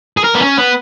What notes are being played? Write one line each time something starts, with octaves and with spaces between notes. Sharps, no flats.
G#4
A#4
B3
C#4
B3